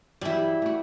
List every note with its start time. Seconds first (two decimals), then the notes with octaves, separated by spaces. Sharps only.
0.21 G2 E3 F#3 G3 E4
0.62 A3 F#4